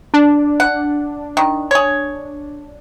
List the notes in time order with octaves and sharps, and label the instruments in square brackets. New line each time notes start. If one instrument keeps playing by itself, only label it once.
[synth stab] D4
[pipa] F#5
D#3
G#4 C#5